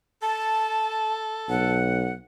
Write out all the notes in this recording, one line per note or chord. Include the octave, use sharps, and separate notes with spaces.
A4 A5
B1 F#5